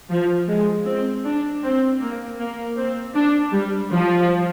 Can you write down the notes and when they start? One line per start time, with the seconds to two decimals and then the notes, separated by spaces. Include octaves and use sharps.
0.10 F3
0.48 G#3
0.86 C4
1.25 D4
1.63 C4
2.00 A#3
2.39 A#3
2.77 C4
3.14 D4
3.53 G3
3.91 F3